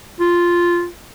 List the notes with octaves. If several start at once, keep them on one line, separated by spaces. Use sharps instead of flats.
F4